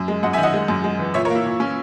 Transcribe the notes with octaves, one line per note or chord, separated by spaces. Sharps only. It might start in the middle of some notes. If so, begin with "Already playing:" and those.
Already playing: F#2
G#3
F#2 D#5 F#5
E5 G#5
D#3
D#5 F#5
G#3
F#2
G#3
E3
A#2 C#5 E5
A#4 C#5
A#3 E4
A#2
C#4